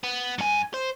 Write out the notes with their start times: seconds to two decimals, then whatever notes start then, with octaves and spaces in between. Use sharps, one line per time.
0.03 B3
0.38 G2 G#5
0.74 C5